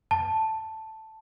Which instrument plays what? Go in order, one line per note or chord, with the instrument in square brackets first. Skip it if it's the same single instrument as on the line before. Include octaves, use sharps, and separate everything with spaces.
[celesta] A5